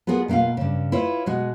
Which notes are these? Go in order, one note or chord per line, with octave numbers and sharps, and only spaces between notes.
B3 F4 F#4 G#4 A#4
B2 A#3 D#4 F4 F5
G2 C#3
E4 F4 B4 C#5 D5
B2 G#3 F#4